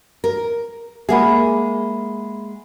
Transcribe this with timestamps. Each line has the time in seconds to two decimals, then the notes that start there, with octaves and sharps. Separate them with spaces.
0.24 A#4
1.09 G#3 A#3 G#4 E5 F#5 B5